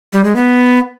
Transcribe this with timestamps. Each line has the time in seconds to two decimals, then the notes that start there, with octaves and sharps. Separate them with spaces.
0.13 G3
0.24 G#3
0.36 B3